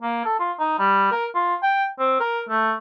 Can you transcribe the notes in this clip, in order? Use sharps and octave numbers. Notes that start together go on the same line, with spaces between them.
A#3
A4
F4
D#4
G3
A#4
F4
G5
C4
A#4
A3